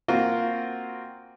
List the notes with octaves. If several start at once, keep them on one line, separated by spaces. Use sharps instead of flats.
A#3 C4 F4 F#4